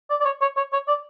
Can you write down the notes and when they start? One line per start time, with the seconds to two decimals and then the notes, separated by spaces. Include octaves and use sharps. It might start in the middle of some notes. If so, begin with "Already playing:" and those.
0.10 D5
0.21 D5
0.25 C#5
0.41 C#5
0.57 C#5
0.73 C#5
0.88 D5